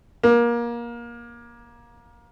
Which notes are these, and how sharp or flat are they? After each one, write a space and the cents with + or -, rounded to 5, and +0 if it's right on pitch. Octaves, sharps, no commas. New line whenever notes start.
A#3 +25